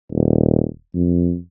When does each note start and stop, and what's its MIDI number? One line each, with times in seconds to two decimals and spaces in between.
0.12 0.65 27
0.95 1.36 41